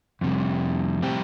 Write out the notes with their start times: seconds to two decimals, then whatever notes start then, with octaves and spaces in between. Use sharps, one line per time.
0.21 F2 C3 G3
1.02 A2 G3 C4 G4